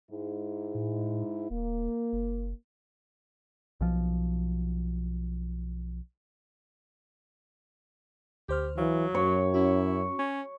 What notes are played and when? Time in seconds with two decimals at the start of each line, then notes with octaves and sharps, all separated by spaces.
0.11 G#2 G#3 E4
0.75 A2
1.50 D#1 A#3
2.13 F#1
3.81 B1 F3
8.49 D2 G4 C5 F6
8.78 E3 F#3 F5
9.15 F#2 C#5
9.54 C#4 E4 F#4
10.19 C#4